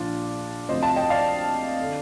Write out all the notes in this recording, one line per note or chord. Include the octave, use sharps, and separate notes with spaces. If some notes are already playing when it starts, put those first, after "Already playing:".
Already playing: A#1 A#2 F3 D4 F4
D2 C3 F3 C5 D#5
F5 A5
D#5 G5
D5 F5
D3